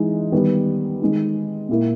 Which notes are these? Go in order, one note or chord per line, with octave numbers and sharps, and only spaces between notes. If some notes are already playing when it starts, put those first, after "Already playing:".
Already playing: E3 G#3 D#4 G#4
D#3 G3 B3
D#3 G#3 D#4
A#2 A#3 E4